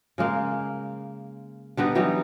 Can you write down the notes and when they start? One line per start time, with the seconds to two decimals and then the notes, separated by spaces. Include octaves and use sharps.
0.18 C#3 G#3 A#3
1.77 D3 G3 B3 D#4
1.95 E3 F#3 G3 D#4